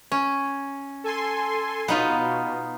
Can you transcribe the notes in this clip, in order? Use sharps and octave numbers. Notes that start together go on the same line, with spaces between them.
C#4
A4 G#5 C6
B2 B3 D#4 F4